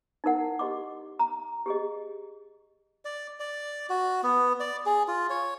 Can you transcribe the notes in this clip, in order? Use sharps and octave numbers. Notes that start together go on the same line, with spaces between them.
D#4 E4 A#4 F#5
G4 D#5 C6 D6
A#5
G4 G#4 D#5
D5
D5
F#4
B3
D5
G#4
F4
C#5